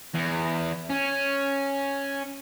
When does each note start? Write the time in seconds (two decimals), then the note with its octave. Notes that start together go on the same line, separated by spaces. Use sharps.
0.14 E2
0.90 C#4